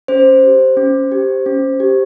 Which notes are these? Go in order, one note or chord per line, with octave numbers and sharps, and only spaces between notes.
C#4 C5
G4
C#4
G4
C#4
G4